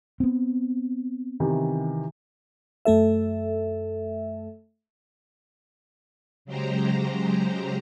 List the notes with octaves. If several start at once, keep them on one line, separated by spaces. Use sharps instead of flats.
B3 C4
C3 D#3 E3
F#2 A3 A4 E5
C#3 F#3 G#3 G4 C5 A#5